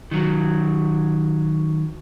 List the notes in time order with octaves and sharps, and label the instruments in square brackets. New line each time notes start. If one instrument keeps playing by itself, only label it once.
[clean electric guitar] D#3 F#3